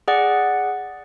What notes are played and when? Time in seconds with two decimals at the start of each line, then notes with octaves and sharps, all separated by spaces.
0.08 G#4 D5 F#5